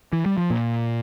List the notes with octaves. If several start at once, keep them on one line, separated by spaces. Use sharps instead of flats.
E3
G3
F3
A#2